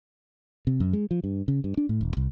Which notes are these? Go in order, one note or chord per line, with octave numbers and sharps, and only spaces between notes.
C3
F#2
G#3
F3
G2
C#3
G2
D4
A2
E1
C2